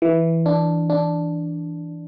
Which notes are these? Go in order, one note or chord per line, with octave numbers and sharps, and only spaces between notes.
E3
D4
D4